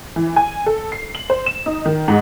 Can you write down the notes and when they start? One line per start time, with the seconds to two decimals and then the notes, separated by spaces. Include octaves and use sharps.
0.16 E3
0.36 G#5
0.66 A4
0.92 C7
1.15 F#7
1.30 C5
1.46 E7
1.66 D#4
1.86 D#3
2.08 G#2